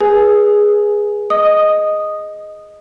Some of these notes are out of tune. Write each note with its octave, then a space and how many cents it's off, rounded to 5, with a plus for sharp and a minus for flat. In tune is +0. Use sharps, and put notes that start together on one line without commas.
G#4 -5 B4 -25 G#5 +10
D#5 +0 D#6 -5